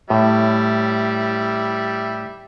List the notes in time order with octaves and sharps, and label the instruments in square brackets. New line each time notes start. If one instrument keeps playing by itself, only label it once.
[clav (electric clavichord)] A2 [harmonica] G3 E5